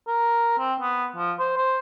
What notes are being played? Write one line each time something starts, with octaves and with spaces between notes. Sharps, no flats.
A#4
C4
B3
F3
C5
C5